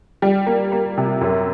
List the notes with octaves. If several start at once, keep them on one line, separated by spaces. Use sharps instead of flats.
G3
A#3
A#3
C3
F#2